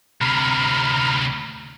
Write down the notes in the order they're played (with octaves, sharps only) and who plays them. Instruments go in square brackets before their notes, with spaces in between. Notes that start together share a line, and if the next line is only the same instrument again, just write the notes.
[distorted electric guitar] D2 C3 [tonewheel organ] A#5 B5 F6